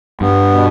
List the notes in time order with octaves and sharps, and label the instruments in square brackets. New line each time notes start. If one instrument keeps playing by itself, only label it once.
[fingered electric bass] G2 [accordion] B3
[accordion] B2